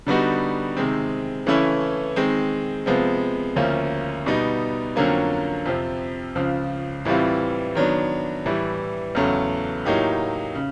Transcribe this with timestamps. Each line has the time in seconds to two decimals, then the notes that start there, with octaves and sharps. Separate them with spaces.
0.07 D3 G3 B3 D#4 F#4
0.77 C3 D#3 G#3 C4
1.46 C#3 E3 A3 C#4 E4
2.16 D#3 G#3 C4
2.86 C3 F3 G#3 B3
3.56 D2 C#3 F3 A#3 C#4
4.26 B2 G3 B3 D#4
4.96 F2 D3 F#3 A#3 C#4
5.66 F2 C3 F3
6.35 C#2 C#3 F3
7.05 A2 E3 G3 C4 F4
7.75 D#3 F#3 B3 D4
8.46 A2 E3 G3
9.15 E2 C#3 F#3 A3
9.85 A2 F#3 A#3 D#4 G4
10.55 C#3